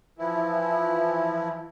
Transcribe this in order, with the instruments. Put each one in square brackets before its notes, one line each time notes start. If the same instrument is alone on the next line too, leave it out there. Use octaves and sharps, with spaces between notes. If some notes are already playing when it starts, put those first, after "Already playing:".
[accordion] E3 F3 E4